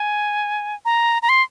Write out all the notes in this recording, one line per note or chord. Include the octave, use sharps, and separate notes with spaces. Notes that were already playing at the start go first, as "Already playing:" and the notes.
Already playing: G#5
A#5
A#5
C6